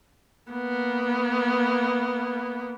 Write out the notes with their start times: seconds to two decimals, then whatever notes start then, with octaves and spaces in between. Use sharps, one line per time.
0.52 A#3 B3